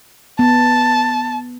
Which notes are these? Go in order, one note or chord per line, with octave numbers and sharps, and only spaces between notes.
B3 A5